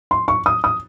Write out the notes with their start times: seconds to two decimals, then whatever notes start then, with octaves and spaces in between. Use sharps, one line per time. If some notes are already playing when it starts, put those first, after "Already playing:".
0.11 C6
0.28 C#6
0.46 D#6
0.64 D#6